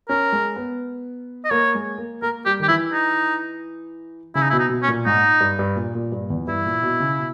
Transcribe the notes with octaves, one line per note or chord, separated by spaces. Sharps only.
C#4 A#4
G#3
B3
D#5
A#3 C#5
G#3
A#3
A#3 A#4
G3 G4
D#3 G4
E3 E4
D#4
C#3 E4
D#4
E4
B2
D#4
B2
C#4
A#2
G#2 D#4
G2
G2
A#2
A#2
G2
E2
G2 E4
A#2
B2
C#3
B2